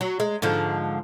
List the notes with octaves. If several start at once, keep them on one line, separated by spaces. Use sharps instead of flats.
F#3
G#3
G#2 D3 F3